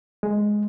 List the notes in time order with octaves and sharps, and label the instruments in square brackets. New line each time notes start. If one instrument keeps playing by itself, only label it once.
[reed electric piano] G#3